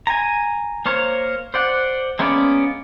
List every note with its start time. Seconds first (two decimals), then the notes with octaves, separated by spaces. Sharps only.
0.07 G#5 A#5
0.86 A#3 A#4 C5 C#5
1.54 C5 D5 F#5
2.19 G#3 A#3 B3 C#4 D5